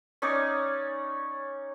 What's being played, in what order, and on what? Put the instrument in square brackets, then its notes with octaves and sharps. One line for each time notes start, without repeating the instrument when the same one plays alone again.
[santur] C#4 D#4 C#5 D5